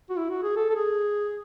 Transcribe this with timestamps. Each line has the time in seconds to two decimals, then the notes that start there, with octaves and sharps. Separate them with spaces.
0.10 F#4
0.18 E4
0.30 F#4
0.43 G#4
0.56 A4
0.70 A4
0.75 G#4